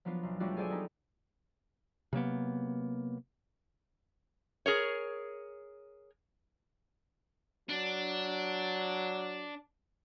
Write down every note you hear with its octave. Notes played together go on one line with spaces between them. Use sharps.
F3 F#3 B3 D4 F4
B1
F#3 G3 A3 D4 F4 F#4
G#4 A4 C5 D5 G#5
G3 B3 D#4
C3 F#3 A#3 B3
G#4 A#4 C#5
F#3 D4